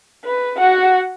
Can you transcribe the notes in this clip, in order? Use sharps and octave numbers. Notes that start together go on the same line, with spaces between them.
B4
F#4 F#5